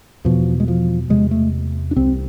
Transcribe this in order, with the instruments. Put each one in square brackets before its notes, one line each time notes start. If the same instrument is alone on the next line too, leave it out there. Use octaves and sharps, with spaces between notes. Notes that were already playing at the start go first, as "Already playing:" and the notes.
[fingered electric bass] E2 B2 F3
G#3
F3
E2 C3 G#3
A3
D4
C2 C3 C4